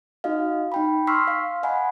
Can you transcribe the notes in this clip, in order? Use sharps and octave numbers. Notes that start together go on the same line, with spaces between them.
D#4 F#4 D#5 F5
D#4 G5 B5
C6 C#6 E6 F6 B6 C7
F5
D#5 F#5 G#5 B5